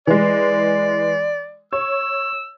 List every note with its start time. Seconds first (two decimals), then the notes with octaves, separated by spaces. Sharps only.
0.07 E3 G#3 D5
1.73 C#5 E6